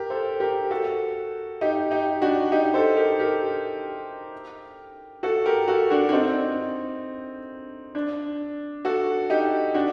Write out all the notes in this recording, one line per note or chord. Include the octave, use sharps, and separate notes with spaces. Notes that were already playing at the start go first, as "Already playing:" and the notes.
Already playing: G4 A#4
A4 C5
G4 A#4
F#4 A4
D#4 G4
D#4 G4
D4 F#4
D#4 G4
A4 C5
G4 A#4
G4 A#4
F#4 A4
G4 A#4
F#4 A4
D4 F#4
D4
C4 D#4
D4
F#4 A4
D#4 G4
D4 F#4